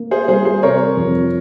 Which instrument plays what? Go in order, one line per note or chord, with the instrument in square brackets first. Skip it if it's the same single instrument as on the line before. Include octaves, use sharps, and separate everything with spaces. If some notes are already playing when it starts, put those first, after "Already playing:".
Already playing: [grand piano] A#3
[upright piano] G#4 C5
[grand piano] G3 [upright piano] G#4 C5
[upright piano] G#4 C5
[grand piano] C3 [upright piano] A#4 C#5
[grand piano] F2